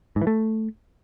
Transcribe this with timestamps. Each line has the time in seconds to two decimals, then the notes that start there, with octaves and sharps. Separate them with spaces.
0.16 G#2
0.22 E3
0.27 A3